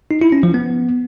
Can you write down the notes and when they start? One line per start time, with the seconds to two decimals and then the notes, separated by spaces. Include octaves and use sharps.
0.11 D#4
0.21 E4
0.32 C#4
0.43 F3
0.54 B3